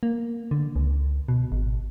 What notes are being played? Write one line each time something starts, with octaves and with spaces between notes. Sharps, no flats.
A#3
D3
C#2
B2
G#1